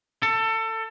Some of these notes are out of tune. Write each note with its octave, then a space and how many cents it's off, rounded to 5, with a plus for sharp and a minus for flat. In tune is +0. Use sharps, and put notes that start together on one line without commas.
A4 +25